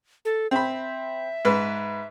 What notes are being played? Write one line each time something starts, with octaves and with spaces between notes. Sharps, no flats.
A4
C4 E5 B5
G#2 B4